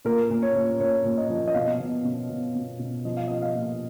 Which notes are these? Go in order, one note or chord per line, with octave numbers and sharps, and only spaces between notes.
A#2 A#4
A#2
C#5
A#2
A#2 C#5
A#2
D#5
F3
D#5
B2 F5
B2
B2
B2
B2
B2
F3 D#5
F5
F3 D#5
F5
A#2